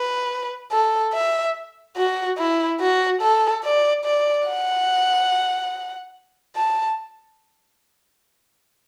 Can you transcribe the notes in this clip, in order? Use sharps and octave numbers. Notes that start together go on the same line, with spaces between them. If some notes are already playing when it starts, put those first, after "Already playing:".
Already playing: B4
A4
E5
F#4
E4
F#4
A4
D5
D5
F#5
A5